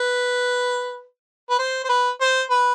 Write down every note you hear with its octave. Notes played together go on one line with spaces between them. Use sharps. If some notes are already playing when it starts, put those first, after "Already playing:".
Already playing: B4
B4
C5
C5
B4
C5
B4